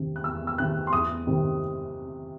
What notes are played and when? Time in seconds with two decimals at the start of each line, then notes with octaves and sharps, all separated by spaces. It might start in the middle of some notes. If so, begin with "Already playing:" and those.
Already playing: E2 C3 D#3
0.16 F#6
0.24 E2 E6
0.47 E6
0.58 C3 D#3 F#6
0.87 C6
0.93 E2 D#6
1.27 C3 D#3